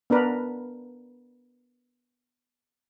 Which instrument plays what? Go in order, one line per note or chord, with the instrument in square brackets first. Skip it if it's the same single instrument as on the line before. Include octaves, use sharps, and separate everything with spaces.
[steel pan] B3 D4 A#4 B4